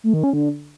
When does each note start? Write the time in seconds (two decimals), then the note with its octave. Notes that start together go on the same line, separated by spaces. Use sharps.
0.04 A3
0.14 D#3
0.23 C#4
0.33 D3